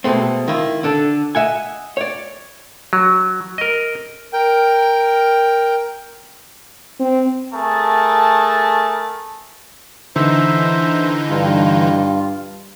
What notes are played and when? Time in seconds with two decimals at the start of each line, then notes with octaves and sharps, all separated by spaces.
0.04 B2 G#3 A3 C4
0.48 D#3 E4 F4
0.83 D3 D4 A4
1.35 D#5 E5 F#5 G#5
1.97 C#5 D5
2.93 F#3
3.58 A#4 D#5
4.33 A#4 G5
7.00 C4
7.54 A3 G#4 A#4 A5
10.16 D3 E3 D#4 C5 E5
11.30 G2 F4